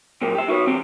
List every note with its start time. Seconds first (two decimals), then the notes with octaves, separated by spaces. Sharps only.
0.21 A#2 F#3 A#3 G4
0.35 G4 E5
0.48 D#4 F#4 A4 B4 C#5
0.66 E2 C4 G4